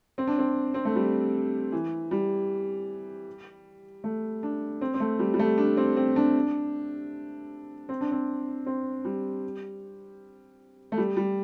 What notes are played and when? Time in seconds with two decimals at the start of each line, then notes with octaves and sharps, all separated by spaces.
0.18 C4
0.27 D4
0.39 C4
0.74 C4
0.85 A3
0.95 G3
1.72 E3
2.11 G3
4.04 A3
4.43 D4
4.81 C4
4.94 C4
5.00 A3
5.19 G3
5.34 G3
5.39 A3
5.58 D4
5.77 C4
5.97 C4
6.16 D4
7.89 C4
8.01 D4
8.12 C4
8.66 C4
9.05 G3
10.92 A3
10.98 G3
11.17 G3